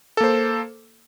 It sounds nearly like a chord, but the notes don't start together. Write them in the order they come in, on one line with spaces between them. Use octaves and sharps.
A4 A#3 C5